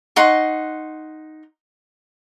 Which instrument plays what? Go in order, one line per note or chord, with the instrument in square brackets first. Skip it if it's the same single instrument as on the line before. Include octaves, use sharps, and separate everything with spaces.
[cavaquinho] D#4 F#5 C6 C#6